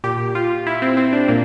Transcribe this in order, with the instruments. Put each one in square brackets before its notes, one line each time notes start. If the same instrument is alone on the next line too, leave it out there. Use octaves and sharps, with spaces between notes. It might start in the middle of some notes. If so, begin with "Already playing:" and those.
[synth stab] A#2 G4
F4
E4
C4
C4
D4
A#2 A#3